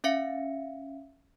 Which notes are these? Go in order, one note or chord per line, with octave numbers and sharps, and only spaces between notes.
C#4 E5 F5 C#7